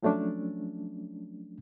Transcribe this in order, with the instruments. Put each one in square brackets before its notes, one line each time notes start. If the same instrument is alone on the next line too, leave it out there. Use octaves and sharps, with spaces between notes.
[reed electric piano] F3 F#3 A3 C#4 D4